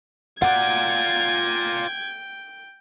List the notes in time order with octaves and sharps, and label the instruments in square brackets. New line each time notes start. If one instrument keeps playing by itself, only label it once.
[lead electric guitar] F4 D5 [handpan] F#5 [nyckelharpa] G5 [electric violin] G#6